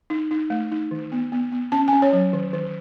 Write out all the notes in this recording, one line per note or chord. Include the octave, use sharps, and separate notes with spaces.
D#4
D#4
A3
D#4
D#3
B3
B3
B3
C#4 A5
C#4 G#5
C#5
F#3
D#3
D#3